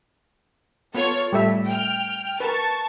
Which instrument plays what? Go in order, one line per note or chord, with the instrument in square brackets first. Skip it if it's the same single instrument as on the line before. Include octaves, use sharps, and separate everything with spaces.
[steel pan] B3 [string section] F4 A4 C#5
[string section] A2 [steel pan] G3 A4 E5
[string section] G5 F6
[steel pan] A#4 B4 [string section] A5 C#6